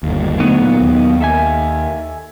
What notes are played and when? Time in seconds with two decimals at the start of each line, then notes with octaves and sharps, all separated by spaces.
0.03 G1 D#2
0.40 D3 F#3 A3 B3 D#4
0.62 A#2
0.81 D#2
1.21 A4 E5 G#5